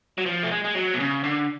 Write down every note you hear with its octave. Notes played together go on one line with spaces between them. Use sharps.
F#3
F3
A3
G#3
G#3
F#3
B2
C#3
D3